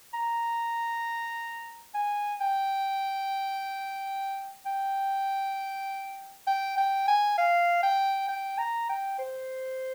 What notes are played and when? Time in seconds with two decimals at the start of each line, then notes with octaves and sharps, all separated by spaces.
0.13 A#5
1.95 G#5
2.40 G5
4.66 G5
6.47 G5
6.78 G5
7.08 G#5
7.38 F5
7.83 G5
8.29 G5
8.58 A#5
8.89 G5
9.19 C5